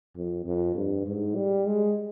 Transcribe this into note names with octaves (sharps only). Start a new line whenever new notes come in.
F2
F2
G2
G#2
G3
G#3